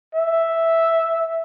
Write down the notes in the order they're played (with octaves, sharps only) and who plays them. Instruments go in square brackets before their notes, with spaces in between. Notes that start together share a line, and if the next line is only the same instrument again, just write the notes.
[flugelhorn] E5